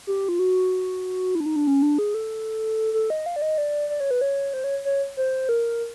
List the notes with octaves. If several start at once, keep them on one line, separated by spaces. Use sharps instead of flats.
G4
F4
F#4
E4
D4
D#4
D4
C#4
D4
G#4
A4
A4
D#5
F5
D5
D#5
D5
D5
C#5
B4
C#5
C5
C#5
C#5
C5
A#4